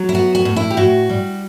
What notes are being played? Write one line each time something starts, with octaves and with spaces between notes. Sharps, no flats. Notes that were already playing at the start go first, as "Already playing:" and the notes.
Already playing: F#3
E4
B3 F#4
F#4
A2
E4
G4
A2 F#4
G3